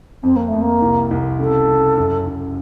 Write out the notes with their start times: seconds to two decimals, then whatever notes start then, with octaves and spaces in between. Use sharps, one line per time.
0.23 F2 C4
0.36 A#3
0.48 F2 A3
0.61 A#3
0.82 C2
1.11 C2
1.39 C#3 A4
1.68 C#3
1.98 F#2
2.26 F#2